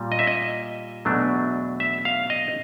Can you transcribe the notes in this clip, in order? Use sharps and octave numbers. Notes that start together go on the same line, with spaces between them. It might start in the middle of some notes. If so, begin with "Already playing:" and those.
Already playing: A#2 G3
D#5
E5
D#5
E2 B2 F#3 A3 D4
E5
F5
D#5